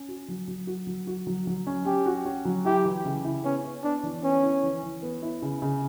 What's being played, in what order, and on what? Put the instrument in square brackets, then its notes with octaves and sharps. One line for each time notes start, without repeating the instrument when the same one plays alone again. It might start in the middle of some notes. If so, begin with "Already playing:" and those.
Already playing: [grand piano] C#4
F#4
F#3
F#3
F#4
F#3
F#4
F#3
F#3
C#4
[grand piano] C#4 [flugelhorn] G4
[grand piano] F#4
C#4
F#3
[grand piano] E4 [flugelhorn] G4
[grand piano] E3
C#3
E4
[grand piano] B3 [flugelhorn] C#4
[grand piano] B3
[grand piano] B3 [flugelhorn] D4
[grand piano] E3
[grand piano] B3 [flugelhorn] C#4
[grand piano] E4
E3
E3
B3
E4
C#3
C#3